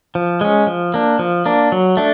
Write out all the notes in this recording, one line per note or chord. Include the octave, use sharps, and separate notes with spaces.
F3
G#3 C#4
F3
A#3 D4
F3
A#3 D4
F#3
A3 D4